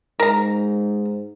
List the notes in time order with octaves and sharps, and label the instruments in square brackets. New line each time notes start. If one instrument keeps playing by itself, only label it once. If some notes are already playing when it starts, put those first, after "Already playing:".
[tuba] G#2 [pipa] A#4 A#5